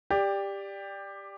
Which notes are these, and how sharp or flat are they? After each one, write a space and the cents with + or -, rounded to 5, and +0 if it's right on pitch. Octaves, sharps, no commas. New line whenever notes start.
G4 +15 D5 +0